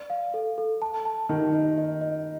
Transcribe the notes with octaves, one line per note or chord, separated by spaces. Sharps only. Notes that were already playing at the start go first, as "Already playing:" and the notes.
Already playing: D5
F5
A4
A4
A5
A5
D#3 D#4
D#5
D#5
D#5